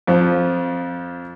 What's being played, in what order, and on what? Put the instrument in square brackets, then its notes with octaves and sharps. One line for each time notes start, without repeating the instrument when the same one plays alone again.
[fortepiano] F2 F3